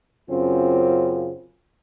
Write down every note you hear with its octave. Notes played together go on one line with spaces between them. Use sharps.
F#2 C#3 C4 F4